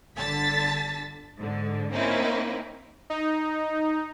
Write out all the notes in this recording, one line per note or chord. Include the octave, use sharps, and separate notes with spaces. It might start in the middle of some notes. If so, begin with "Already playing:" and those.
G1 D3 A5 A6 B6
G#2 D3
A#3 C4 C#4 D#4 E4
D#4